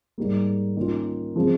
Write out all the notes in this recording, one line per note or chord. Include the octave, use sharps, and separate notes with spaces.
G#2 G3 A#3
D#3 A#3 C#4 F4
C#3 F3 G#3 C4